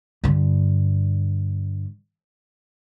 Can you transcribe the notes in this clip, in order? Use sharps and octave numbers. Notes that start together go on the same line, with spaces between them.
G2 D3